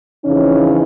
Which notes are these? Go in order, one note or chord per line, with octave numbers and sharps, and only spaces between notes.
F2 C#3 E3 C#4 D#4